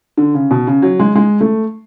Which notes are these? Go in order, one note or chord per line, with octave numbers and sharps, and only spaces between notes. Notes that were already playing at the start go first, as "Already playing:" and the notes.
D3
C#3
B2
C#3
F#3
G#3
G#3
A3